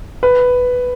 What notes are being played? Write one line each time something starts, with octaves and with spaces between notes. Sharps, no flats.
B4